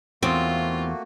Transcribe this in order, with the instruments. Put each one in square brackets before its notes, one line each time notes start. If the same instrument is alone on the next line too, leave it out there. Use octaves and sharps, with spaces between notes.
[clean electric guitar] E2 [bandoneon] A3 A#3 F#4 [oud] C4 [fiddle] F4